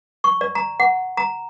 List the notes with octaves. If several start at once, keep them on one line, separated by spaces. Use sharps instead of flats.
C#6
D5
A#5
F#5
A#5